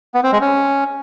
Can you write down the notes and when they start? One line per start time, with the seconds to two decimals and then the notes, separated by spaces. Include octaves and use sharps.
0.14 B3
0.23 C4
0.32 G#3
0.41 C#4